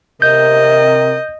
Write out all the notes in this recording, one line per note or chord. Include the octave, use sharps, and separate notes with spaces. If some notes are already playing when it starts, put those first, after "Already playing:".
C3 A#4 D#5 G6